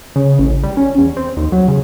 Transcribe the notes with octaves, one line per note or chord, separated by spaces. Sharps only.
C#3
A1
G3
C#4
E2
C4
D#2
F#3
C#3